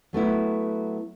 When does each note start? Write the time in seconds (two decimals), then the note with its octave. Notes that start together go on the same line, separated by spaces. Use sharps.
0.13 F#3 A3 B3 E4